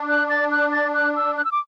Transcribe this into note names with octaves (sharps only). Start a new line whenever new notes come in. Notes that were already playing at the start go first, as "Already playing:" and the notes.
Already playing: D4
F#6
A6
F#6
A6
F#6
E6
F#6
E6
D6